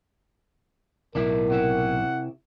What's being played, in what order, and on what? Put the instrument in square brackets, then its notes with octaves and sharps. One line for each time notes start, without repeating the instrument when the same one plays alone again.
[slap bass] B1 A2 [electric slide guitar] D4 E4 [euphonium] A#4
[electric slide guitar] C3 E4 E5 [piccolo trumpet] F#5